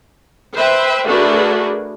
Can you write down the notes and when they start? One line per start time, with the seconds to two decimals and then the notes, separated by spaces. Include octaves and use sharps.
0.55 B4 C5 E5 G5
1.05 A3 D4 F#4 G#4 A#4 B4